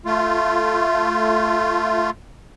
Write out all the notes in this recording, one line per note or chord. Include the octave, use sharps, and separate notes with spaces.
A3 F4